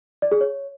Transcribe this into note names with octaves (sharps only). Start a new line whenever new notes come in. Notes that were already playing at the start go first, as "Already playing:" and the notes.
D5
G#4
C#5